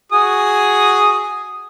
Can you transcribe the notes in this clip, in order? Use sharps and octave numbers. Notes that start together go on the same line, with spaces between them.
F#4 G#4 D#6